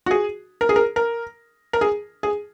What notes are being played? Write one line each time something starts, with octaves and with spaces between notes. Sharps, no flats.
F#4
G#4
A#4
G#4
A#4
A#4
A#4
G#4
G#4